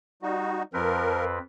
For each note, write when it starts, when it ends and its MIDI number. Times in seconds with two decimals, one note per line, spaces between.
0.22 0.63 55
0.22 0.63 63
0.22 0.63 66
0.74 1.39 41
0.74 1.25 53
0.74 1.39 60
0.74 1.25 70
0.74 1.39 71